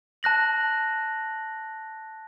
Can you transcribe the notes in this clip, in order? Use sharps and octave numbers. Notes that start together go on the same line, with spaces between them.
A5 F#6 A#6 F#7